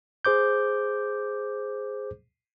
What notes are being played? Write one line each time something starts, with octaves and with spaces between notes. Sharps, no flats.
G#4 C5 D6 G6